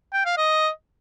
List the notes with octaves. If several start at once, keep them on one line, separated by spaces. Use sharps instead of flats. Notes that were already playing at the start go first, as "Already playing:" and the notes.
G5
F5
D#5